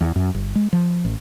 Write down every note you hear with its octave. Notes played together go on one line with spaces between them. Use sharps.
E2
F#2
G1
G#3
F3
A1